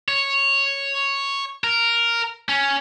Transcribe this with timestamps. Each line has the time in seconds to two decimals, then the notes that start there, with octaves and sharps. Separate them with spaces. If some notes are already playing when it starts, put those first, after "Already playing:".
0.08 C#5
1.64 A#4
2.49 C#4